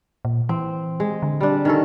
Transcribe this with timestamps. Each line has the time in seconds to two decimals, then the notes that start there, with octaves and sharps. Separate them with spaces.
0.25 A#2
0.49 E3 C4
1.00 G#3
1.22 D3
1.41 G3 D4
1.65 D#3 C#4 A4